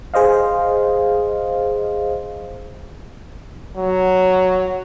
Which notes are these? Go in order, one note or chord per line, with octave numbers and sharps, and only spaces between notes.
G#4 C5 D#5 F5
F#3